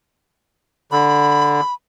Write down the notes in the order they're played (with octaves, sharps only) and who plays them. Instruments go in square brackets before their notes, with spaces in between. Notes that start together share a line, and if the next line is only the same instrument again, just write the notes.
[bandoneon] D3 [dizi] B5